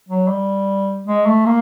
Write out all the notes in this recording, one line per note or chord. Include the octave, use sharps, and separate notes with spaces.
F#3
G3
G#3
A3
A#3